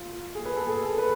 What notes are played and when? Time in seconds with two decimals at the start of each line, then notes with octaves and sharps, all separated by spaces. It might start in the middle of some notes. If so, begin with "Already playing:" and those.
Already playing: F4
0.35 G#4
0.45 B4
0.56 A4
0.67 G#4
0.82 A4
0.98 B4